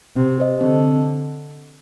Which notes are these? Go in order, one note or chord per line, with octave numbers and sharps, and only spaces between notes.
C3 C4
G4 C5 D#5
D3 C4